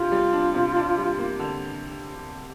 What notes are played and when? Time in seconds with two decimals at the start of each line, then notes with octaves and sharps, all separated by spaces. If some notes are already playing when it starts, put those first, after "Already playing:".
Already playing: C3 D4 F4 G4
0.12 G3
0.33 D4
0.54 C3
0.76 D4
0.98 G3
1.18 A#3
1.40 D3